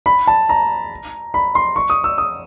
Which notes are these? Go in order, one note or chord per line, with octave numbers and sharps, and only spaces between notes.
B5
A5
A#5
B5
C6
C#6
D#6
E6
D#6